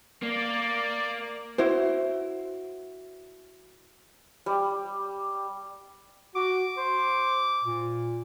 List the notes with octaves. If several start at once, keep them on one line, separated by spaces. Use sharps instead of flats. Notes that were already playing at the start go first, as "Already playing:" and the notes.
A#3 D5
E4 F#4 C5
G3
F#4 D6
C5
A#2